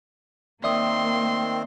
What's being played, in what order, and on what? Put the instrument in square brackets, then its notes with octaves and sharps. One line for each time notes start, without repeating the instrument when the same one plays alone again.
[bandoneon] D#3 C4 [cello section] A#3 [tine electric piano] D5 E5 D#6 [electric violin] C6